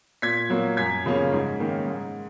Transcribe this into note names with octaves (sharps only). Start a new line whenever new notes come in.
A#2 G#6 B6
F#3 A#3
F#2 G#6 B6
C#3 F3 A#3 C#4
G#2
D#3 A#3 C#4
G#2